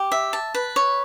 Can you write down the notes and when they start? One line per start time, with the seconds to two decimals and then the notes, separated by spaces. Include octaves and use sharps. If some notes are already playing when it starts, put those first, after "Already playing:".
Already playing: G4
0.12 E5
0.33 A5
0.54 B4
0.76 C#5